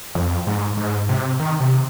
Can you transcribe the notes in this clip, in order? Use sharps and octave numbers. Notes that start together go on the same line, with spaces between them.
F2
G#2
G#2
C3
D#3
C3